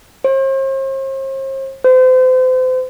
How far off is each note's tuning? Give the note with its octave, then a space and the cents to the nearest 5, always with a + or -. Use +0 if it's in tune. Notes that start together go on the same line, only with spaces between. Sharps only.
C5 +45
C5 -35